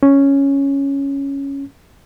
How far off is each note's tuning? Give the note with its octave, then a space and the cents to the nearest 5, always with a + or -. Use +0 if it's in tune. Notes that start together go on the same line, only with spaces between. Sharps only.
C#4 +0